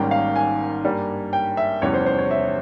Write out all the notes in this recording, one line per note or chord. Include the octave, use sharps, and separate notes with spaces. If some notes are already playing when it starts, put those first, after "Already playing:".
Already playing: G#1 G#2 G3 A#3 C#4 G5
F5
G#5
G2 G3 A#3
G5
E5
F1 E2 E3 G3 C#4 C#5
C5
C5
C#5
E5